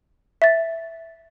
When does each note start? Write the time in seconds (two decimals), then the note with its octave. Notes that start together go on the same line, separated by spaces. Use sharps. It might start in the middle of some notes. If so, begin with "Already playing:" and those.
0.42 E5 A6